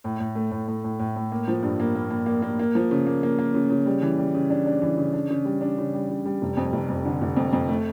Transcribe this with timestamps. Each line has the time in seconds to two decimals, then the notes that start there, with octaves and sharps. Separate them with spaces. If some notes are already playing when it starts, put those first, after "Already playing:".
0.04 A2
0.20 A2
0.35 A3
0.51 A2
0.68 A2
0.84 A2
0.99 A2
1.16 A2
1.32 A#3
1.48 F3
1.63 G2
1.80 A#3
1.95 A#3
2.10 A#3
2.26 A#3
2.42 A#3
2.59 A#3
2.75 F3
2.91 C#3
3.07 A#3
3.23 A#3
3.39 A#3
3.54 C#3
3.70 C#3
3.86 G3
4.02 E3
4.18 G3
4.34 C#3
4.50 D4
4.66 D4
4.82 E3
4.98 C#3
5.13 D4
5.30 C#3
5.45 G3
5.61 D4
5.78 C#3
5.94 G3
6.09 C#3
6.25 G3
6.42 F1
6.57 F2
6.73 F1
6.89 F2
7.05 D3
7.22 F1
7.36 F2
7.53 F2
7.69 A3